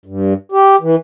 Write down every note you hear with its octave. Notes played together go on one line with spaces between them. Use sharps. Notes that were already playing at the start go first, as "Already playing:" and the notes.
G2
G4
E3